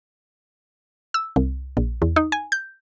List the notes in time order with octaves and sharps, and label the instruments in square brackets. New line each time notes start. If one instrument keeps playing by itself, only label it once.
[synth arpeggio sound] E6
C2
A#1
E2
D#4
G#5
G6